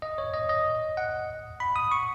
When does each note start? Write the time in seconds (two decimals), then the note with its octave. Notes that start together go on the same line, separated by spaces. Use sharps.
0.02 D#5
0.18 C#5
0.34 D#5
0.49 D#5
0.97 F#5
1.60 B5
1.76 D#6
1.92 C#6